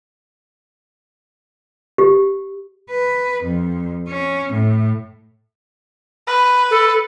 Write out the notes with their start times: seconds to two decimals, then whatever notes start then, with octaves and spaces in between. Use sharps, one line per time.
1.98 G4
2.91 B4
3.44 F2
4.09 C#4
4.53 A2
6.27 B4
6.71 A4